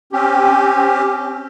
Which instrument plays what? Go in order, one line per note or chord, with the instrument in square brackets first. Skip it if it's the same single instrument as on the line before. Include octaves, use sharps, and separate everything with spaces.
[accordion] C4 C#4 G4